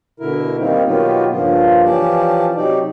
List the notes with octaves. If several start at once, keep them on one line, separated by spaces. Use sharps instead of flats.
B2 D3 E4 A#4
D#3 G3 A#3 C4 D#4
B2 D#3 F#3 B3 F4 G4
G2 C#3 F3 A#3 F4
E3 F3 C#4 G4 D5 A5
C3 F#3 D#4 G4 D5